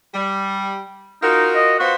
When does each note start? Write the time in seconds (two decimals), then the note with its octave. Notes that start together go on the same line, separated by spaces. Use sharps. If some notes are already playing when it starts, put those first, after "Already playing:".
0.14 G3
1.23 D#4 F4 F#4 A#4
1.55 D#5
1.80 B3 F4 F#4 C5